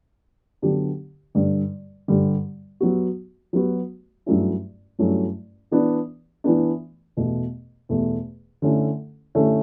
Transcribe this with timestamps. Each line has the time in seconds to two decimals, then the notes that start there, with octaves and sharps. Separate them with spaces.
0.62 D3 F#3 B3 D4 G4
1.35 G2 D3 G3
2.08 G2 D3 G3
2.80 F#3 B3 F#4
3.53 F#3 B3 F#4
4.26 G2 F#3 A3 C#4 E4
4.99 G2 F#3 A3 C#4 E4
5.71 E3 B3 D4
6.44 E3 B3 D4
7.17 E2 B2 A3
7.89 E2 B2 A3
8.62 D3 A3 C#4 E4 A4
9.35 D3 A3 C#4 E4 A4